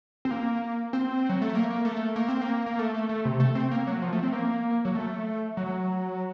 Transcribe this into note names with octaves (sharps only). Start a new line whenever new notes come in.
C4
A#3
C4
F#3
A3
A#3
A#3
A3
A#3
C4
A#3
A#3
A3
A3
A3
C3
A3
C4
A#3
F#3
F3
A3
C4
A#3
F#3
A3
F#3